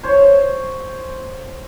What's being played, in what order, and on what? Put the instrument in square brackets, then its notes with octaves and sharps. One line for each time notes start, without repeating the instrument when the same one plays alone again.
[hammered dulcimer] C5 C#5